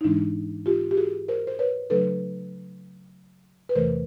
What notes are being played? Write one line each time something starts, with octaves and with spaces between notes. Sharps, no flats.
D#4
G#2 E3 G#3 D4 E4
F4 G4
G4
F#4 G#4
A#4 C5
C5
B4 C#5
C#3 F#3 A3 D4 A4 B4
B4
E2 C3 E3 A3 A#4 C5